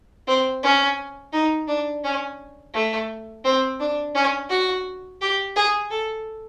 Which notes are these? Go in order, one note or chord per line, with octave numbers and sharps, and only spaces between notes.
C4
C#4
D#4
D4
C#4
A3
C4
D4
C#4
F#4
G4
G#4
A4